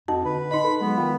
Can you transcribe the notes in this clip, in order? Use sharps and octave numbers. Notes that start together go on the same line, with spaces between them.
F2 D#4 F#4 A5
D3 B4
D#4 D#5 B5
A4 B4
F#3 G#3 B3
D#3 F4